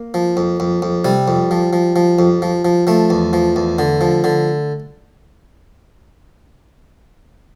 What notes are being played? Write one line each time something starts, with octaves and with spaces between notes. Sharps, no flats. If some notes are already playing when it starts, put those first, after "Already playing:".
Already playing: A#3
F3
F2
F2
F2
C3 G3
F2
F3
F3
F3
F2
F3
F3
F3 A3
E2
F3
E2
D3
F3
D3